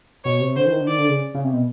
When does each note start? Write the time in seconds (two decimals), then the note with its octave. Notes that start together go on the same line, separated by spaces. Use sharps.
0.24 B2 C#5
0.41 C3
0.56 D3 C5
0.66 E3
0.72 D#3
0.81 D3
0.88 D#3 D5
0.98 D3
1.09 C#3
1.35 C#3
1.44 C3
1.53 B2